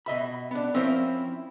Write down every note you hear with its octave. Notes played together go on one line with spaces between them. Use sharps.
B2 D#5 E5 B5
B3 D4
F3 C4 C#4 E4 A#4 C5